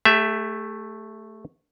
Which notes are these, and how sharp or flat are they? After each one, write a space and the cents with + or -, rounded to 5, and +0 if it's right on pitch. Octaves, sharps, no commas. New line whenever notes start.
A3 +0 G4 +45 E5 +0